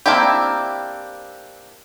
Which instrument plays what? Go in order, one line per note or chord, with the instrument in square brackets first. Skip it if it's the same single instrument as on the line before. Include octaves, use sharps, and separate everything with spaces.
[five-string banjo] A#3 C4 D4 E4 G4